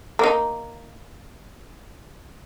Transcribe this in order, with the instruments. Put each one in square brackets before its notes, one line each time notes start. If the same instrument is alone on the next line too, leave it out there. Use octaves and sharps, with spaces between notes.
[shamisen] A#3 D#4